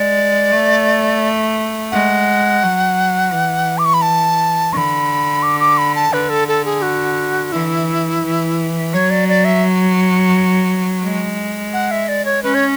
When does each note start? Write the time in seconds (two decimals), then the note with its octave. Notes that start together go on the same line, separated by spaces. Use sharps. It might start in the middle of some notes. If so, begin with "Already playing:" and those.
Already playing: G#3 D5
0.52 A3
1.91 G#3 F#5
2.62 F#3
3.32 E3
3.78 D6
3.85 C#6
3.94 B5
4.02 A5
4.73 D3 B5 C#6
5.43 D6
5.60 D6
5.78 B5
5.95 A5
6.12 D3 B4
6.29 A4
6.48 A4
6.65 G#4
6.82 F#4
7.52 E3 E4
8.23 E3
8.93 F#3 C#5
9.10 D5
9.28 D5
9.45 E5
11.03 G#3
11.73 F#5
11.91 E5
12.08 D5
12.25 C#5
12.43 C#4 B4
12.54 C#5